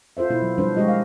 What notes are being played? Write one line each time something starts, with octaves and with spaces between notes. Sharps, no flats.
F4 A4 C5 E5
B2 B3 E4
F#3
F3 G3 D4 B4 C5
G#3 A#3 F#4 G4 D#5
F5